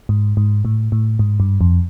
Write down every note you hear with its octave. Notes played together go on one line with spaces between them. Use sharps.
G#2
G#2
A2
A2
G#2
G2
F2